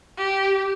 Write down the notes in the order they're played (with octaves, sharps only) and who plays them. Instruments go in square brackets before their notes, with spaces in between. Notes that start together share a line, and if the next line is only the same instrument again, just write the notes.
[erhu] G4